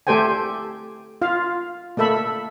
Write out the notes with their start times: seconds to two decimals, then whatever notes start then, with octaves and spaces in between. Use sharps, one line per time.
0.07 A3 G4 A4 C5 G5 G#5
1.22 F4 F5
1.97 A3 A#3 A4 E5 B5